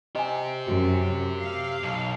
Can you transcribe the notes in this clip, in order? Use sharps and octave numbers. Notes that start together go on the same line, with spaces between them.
G4 C5 D#5 G#5
F#2 F#4
F5
B1